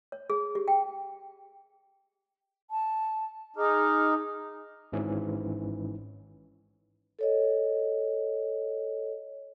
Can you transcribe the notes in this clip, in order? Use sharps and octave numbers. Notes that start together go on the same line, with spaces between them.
C#5
G#4
G4
G5
A5
D#4 G#4 D6 F6
G#1 G#2 E3 C#4
A4 C#5 D#5